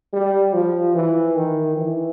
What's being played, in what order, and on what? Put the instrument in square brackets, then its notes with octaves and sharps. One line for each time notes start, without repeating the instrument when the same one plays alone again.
[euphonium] G3
F3
E3
D#3
E3